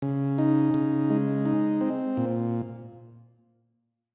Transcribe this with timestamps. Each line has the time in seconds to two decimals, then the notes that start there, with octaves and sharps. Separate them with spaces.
0.02 C#3
0.38 D#4
0.74 C#3
1.10 G#3
1.45 D#4
1.81 C4
2.17 A#2